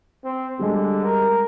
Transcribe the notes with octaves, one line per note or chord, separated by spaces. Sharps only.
C4
D3 G3 G#3
A#4